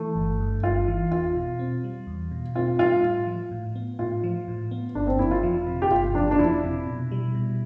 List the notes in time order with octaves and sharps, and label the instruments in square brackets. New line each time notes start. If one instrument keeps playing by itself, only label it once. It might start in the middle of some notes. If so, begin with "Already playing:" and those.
Already playing: [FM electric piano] E3 [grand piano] A3
[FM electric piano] G1
G2
[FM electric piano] G1 [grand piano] F4
[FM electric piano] E3
[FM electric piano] E2 [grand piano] F4
[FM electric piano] B2
C4
G3
E2
B2
[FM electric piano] C4 [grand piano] F4
[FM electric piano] G3 [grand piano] F4
[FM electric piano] A2
F3
A2
B3
[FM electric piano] A2 [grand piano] F4
[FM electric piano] F3
A2
B3
[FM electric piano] G1 [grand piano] D4
[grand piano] C4
[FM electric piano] F2 [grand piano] E4
[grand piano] F4
[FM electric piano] F3
C3
[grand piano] G4
[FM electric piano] G1 [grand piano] F4
[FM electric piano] F2 [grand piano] D4
[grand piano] D4
[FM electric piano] F3 [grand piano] E4
[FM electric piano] C3
B2
G3
B2